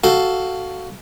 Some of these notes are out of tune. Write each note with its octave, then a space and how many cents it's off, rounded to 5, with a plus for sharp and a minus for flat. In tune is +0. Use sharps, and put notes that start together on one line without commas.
F#4 +10 A4 +0 F5 +0